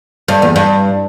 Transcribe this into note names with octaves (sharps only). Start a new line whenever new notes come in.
G2
E2
G2